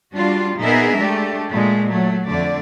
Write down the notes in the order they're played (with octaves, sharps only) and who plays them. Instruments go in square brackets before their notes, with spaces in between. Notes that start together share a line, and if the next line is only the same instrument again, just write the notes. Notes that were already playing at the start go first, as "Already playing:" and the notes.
[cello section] G3 D4 F4 F#4
A#2 B3 D#4 G#4 A#4 E5
G#3 A3 D4 G4
A#2 G#3 A3
F#3 A3
F2 D3 A3 D5